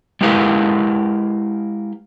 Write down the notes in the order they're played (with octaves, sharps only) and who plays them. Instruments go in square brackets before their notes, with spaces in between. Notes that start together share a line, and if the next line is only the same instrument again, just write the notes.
[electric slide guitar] G#3 E4 G4 A#4 B4 F5